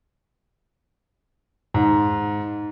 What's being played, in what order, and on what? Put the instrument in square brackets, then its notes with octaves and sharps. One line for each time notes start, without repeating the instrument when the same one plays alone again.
[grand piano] G#2